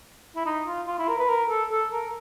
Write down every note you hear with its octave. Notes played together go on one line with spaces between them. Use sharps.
E4
D#4
F4
F4
E4
A#4
B4
A#4
A4
A4
A#4